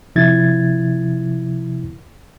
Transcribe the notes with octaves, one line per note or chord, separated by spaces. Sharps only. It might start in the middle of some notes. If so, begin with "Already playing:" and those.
C3 F3 E4 G#6 A6